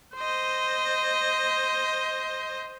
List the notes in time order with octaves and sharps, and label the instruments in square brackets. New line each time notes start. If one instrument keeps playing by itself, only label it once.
[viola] C5 D#5